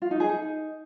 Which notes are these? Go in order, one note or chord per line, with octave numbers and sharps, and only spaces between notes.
F4
D#4
G#4
D#4